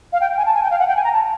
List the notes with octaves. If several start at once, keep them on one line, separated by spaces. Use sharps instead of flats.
F5
G5
G#5
A5
G#5
G5
F5
F#5
G5
G#5
A#5
A5